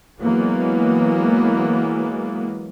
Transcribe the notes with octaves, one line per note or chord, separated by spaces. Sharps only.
E3 F#3 G#3 A#3 B3